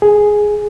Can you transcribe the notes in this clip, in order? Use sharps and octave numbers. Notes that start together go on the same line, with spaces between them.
G#4